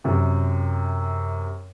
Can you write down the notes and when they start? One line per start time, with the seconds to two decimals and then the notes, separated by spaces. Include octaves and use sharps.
0.04 F#2 C3